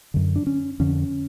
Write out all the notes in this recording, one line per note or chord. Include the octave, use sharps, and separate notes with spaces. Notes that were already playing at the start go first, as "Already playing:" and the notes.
F#2 D3
D4
C#4
F2 D3 C#4